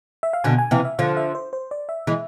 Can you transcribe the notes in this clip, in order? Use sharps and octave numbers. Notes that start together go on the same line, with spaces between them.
E5
F5
B2 D3 G#5
G#5
C3 E3 F5
E5
D3 F3 F5
E5
C5
C5
D5
E5
E3 G#3